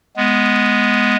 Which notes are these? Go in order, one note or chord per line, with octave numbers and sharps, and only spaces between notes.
G#3 B3